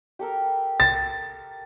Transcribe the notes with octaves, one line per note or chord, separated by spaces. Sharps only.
G4 A4 A#4
A6